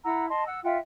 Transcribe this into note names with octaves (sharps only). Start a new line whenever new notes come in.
E4 F#5 A#5 E6
D#5 A5 C6
F#5 E6
F4 E5 F#5 G5